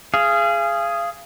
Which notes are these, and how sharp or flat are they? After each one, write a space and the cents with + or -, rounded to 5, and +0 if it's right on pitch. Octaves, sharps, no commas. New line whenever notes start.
G#4 +0 F5 -30